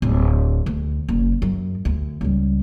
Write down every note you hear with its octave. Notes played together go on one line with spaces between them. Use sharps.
D1
D2
F#1
F#2
D2
C#2 G3